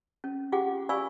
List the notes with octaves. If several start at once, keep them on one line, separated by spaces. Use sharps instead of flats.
C#4
F4 G4 G#4 F#5 G5 D6
D5 F5 G#5 B5 C#6 E6